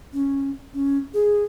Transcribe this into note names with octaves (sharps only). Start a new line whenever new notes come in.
C#4
C#4
G#4